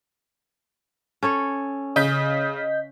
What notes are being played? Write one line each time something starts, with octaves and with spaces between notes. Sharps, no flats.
C#4 A4 C#5
C#3 D#5 G6 B6